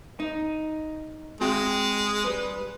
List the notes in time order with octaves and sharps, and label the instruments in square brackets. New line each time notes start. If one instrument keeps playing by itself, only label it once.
[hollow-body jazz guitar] D#4
[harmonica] G#3 [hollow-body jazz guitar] C4 F#4 G5
[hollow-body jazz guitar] G3 B4